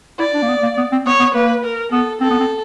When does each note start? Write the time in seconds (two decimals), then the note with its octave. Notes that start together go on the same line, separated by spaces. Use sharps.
0.19 E4 D5
0.34 D4
0.42 A#3
0.48 B3
0.63 A#3
0.78 B3
0.92 C4
1.06 B3 C#5
1.20 B3
1.34 A#3 B4
1.64 A#4
1.92 B3 A4
2.21 C4 A4
2.31 B3
2.40 C4